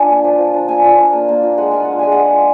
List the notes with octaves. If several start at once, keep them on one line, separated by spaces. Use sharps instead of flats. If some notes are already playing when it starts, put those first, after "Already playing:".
Already playing: D4 F4 G#5
A#3
F3
F3
D4
A#3 G#5
F4
D4
A#3
A#3
F4
G#3 F#5
F4 G#5
D4 F#5
G#3 G#5
F#5
G#3
F4